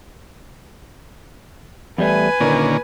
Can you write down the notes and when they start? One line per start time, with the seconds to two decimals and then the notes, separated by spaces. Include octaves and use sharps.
1.98 E2 G3 A3 B4 G#5
2.40 A#2 D3 D#3 A#3 C#4